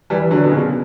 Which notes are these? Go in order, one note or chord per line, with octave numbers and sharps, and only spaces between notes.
E3 G3
D3 F#3
B2
A#2 C#3